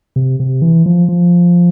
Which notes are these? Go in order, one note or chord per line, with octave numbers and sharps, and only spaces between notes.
C3
C3
E3
F3
F3